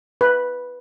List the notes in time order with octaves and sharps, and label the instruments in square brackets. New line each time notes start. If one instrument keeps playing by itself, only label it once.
[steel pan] B4